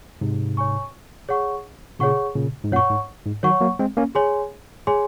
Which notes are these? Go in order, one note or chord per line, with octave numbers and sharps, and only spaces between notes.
G#2 C3
C#5 G#5 C#6
G#4 C#5 F#5 C#6
A#2 C#3 G#4 C#5 F#5 C#6
A#2 C#3
G#2
F#2 A#2 C#5 F#5 C#6
G#2
G#2
D#3 F#3 C#5 F#5 C#6
F#3 A#3
G#3 C4
A#3 C#4
G#4 C#5 G#5 C6
G#4 C#5 G#5 C6